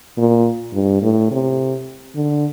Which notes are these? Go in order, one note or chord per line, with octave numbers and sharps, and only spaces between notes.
A#2
G2
A2
C3
D3